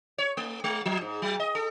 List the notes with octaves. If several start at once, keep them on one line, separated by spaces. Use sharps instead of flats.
C#5
A3
G#3
F3
G#2
F#3
D#5
A4